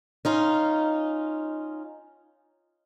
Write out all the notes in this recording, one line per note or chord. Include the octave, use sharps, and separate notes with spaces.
C#4 D#4 F4